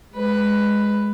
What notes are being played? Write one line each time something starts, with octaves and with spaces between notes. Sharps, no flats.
G#3 B4